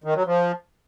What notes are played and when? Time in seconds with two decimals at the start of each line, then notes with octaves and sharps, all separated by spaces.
0.04 D#3
0.15 F#3
0.26 F3